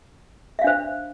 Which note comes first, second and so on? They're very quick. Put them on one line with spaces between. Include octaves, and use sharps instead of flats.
E5 F5 D4 C5